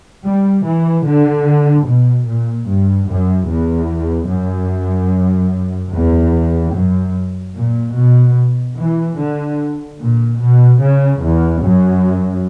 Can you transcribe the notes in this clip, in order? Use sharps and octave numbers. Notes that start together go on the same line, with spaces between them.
G3
E3
D3
B2
A#2
G2
F#2
E2
F#2
E2
F#2
A#2
B2
E3
D3
A#2
B2
C#3
E2
F#2